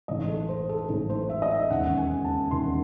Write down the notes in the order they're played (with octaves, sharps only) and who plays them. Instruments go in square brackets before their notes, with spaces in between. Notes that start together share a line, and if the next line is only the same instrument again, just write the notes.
[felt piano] A1 G#2 E3 D#5
A4
C5
A4
A1 G#2 E3 A4
C5
E5
D#5
E5
E1 D#2 C#3 F#5
G#5
A5
E1 D#2 C#3 C6